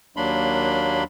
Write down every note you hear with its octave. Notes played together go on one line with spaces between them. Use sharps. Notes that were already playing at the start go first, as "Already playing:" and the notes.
D#2 F#3 A#3 D4 B5 C6